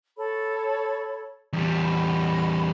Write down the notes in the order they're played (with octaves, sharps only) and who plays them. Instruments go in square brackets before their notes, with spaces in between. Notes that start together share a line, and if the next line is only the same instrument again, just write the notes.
[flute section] A4 C#5 B5
[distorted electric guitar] E2 G3
[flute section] D#5 F#5 B5